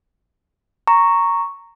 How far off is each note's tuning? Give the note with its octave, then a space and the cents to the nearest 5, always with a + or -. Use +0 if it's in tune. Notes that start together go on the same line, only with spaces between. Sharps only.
A#5 -10 C#6 +0